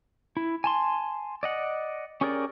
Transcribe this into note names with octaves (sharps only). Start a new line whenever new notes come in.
E4
G#5 A5 C6
D5 D#5 F#5
C#4 G4 G#4 A#4 D5